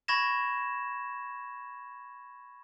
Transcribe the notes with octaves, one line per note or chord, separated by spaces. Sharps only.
B5 C#6 G#6 A#6 E7